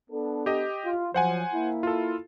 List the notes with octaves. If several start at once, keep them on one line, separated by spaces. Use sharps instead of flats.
B3 D4 A4
G4 D#5
F4
F3 F#3 C5 F#5 G#5
A#3 E4
F4 A4